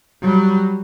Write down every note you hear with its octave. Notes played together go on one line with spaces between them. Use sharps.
F#3 G3